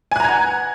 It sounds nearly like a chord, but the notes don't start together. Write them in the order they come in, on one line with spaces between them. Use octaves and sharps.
G#5 F#6 A#5 G#6 F#5